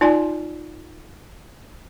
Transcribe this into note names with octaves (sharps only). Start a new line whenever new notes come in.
D#4 F4 D5 G#5 C6